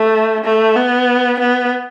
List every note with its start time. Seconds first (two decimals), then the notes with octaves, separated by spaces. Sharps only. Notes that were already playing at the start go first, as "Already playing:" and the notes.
Already playing: A3
0.44 A3
0.76 B3
1.40 B3